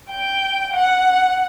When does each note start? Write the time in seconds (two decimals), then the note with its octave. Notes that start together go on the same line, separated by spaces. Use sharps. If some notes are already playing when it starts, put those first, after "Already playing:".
0.11 G5
0.74 F#5